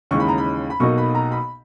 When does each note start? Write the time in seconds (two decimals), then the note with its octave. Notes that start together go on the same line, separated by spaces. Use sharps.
0.11 D#2 C#3 E3 G#3 D#4 C#6
0.20 B5
0.28 A#5
0.38 B5
0.70 B5
0.80 B1 B2 A#3 D#4 C#6
0.98 B5
1.15 A#5
1.32 B5